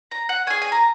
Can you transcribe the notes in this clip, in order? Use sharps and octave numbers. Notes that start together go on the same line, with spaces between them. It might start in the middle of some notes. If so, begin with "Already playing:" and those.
A#5
F#5
C#4 G#4 G#5
G#5
A#5